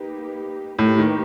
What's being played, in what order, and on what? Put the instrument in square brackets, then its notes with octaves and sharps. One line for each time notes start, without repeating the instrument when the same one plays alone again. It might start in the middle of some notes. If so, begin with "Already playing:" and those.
Already playing: [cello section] A#3 D#4 G4 B4
[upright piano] A2 [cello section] A#3 D#4 G4 B4
[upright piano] D#3